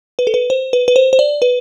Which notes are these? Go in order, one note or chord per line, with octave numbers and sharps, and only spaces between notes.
B4
A4
B4
C5
B4
B4
C5
C5
D5
B4